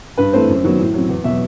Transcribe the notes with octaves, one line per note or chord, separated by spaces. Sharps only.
G2 B4
E3 A3 C4 C5
F#2
D#3 F#3 B3
A2
F#3 C4
E2
B2 F#3 E5